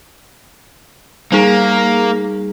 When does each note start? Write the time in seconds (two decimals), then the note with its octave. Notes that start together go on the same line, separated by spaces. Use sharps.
1.32 G3 A#3 D#4 G#4